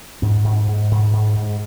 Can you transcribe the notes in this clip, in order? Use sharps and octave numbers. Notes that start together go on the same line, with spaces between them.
G#2 C4
G#2
G#2
G#2
G#2
G#2